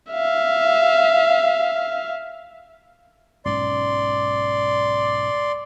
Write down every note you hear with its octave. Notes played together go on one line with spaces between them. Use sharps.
E5 F5
B1 G#2 C#4 D5 C6